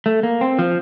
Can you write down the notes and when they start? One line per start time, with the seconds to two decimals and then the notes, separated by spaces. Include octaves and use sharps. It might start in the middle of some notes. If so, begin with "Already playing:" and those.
0.06 A3
0.23 A#3
0.41 C4
0.59 F3